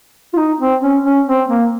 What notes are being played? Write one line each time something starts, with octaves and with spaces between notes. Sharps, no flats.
F4
D#4
C4
C#4
C#4
C4
A#3